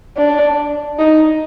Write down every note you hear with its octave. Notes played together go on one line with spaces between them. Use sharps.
D4
D#4